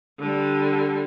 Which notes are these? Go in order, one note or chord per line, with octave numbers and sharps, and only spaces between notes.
D3 G3